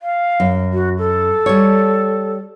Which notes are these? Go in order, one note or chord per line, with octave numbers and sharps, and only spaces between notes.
F5
F#2
F#4
A4
G3 C#5